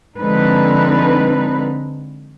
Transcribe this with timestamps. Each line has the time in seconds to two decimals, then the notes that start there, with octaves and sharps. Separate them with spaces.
0.19 D3 F3 G#3 C4 D#4 B4